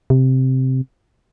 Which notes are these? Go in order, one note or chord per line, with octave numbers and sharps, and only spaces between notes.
C3